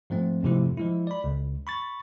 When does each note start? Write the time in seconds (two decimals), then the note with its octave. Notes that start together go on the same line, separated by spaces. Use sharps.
0.10 G#2 F3 A3 C4
0.43 F2 G#2 C3 F3 A3 E4
0.77 F3 G#3 E4
1.07 D5 B5
1.24 C#2
1.67 B5 C#6 A6